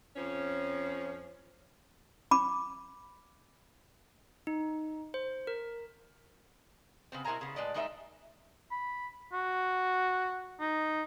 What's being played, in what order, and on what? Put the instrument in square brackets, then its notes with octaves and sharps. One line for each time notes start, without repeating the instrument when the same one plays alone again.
[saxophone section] F2 F3 C#4
[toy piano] B5 D6
[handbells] D#4
C5
A#4
[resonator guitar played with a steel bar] C#3 B3 C4
B2 E4 A#4 C5 G#5 A#5
C#3 B3
A2 G#3 B4 D5 D#5
G3 G#3 D#4 A#4 C#5 E5
[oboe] B5
F#4
D#4